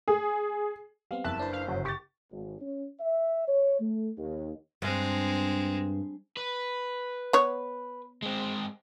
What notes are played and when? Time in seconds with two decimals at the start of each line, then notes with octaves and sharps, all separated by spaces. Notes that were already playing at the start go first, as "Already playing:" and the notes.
0.08 G#4
1.11 G3 B3 C4 F5
1.24 F#1 E5 A5 F#6
1.39 D4 E4 B4 C5
1.53 F5
1.68 G1 C#3 F#3
1.85 G4 C#6 A6
2.31 G#1
2.59 C#4
3.00 E5
3.47 C#5
3.80 A3
4.17 D#2
4.82 G2 G#3 C4
6.37 B4
7.33 B3 C#5
8.22 G#3 C4